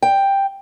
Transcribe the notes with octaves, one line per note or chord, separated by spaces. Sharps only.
G5